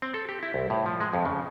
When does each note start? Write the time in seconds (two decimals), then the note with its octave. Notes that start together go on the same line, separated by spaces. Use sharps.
0.02 C4
0.14 A4
0.29 G4
0.43 E4
0.54 C2
0.70 A2
0.86 F3
1.00 G#3
1.13 F2
1.25 C#3